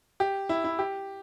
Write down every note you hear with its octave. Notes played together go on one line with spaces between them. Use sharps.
G4
E4
E4
G4